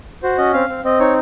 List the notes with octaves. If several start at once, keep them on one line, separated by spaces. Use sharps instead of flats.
F#4 C5
C#4 D#5
C4 F5
C4
C4 D#5
D#4 C#5